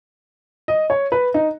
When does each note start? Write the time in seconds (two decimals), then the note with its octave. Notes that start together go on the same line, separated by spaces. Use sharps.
0.68 D#5
0.90 C#5
1.12 B4
1.34 D#4